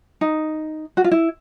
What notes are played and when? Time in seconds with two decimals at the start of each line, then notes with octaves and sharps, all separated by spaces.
0.21 D#4
0.97 F#4
1.04 F4
1.11 E4